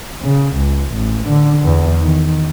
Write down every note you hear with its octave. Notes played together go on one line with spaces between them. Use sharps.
C#3
C#2
A1
D3
E2
D#3